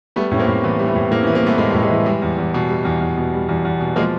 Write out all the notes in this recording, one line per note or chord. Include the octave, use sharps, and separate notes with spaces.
G3 A3 B3
A2 C#4
A#3 C4
A2
E3 A3 B3
G3
A3 B3
A2
A2 A#3 C4
B3 C#4
E3
A#3 C4
G3 A3 B3
A2 G#3 A#3
G3 A3
A2
G#3
E3 G3
G3 G#3
E2
E2
B2
G3
E2
E2
B2
G3
E2
E2
B2
F3 G#3 A#3